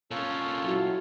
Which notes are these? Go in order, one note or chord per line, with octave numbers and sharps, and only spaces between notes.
A#2 C#4 F4 A4 C#5
F#3 E4